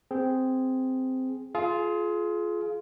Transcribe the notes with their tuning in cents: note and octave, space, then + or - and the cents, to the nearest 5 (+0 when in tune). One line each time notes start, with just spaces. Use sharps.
C4 -10 G#4 +0
F4 -5 G#4 +30